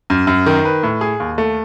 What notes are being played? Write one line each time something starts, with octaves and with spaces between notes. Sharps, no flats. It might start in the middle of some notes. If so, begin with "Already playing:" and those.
F#2
F#2
D#3
B4
A2
G#4
D#2
A3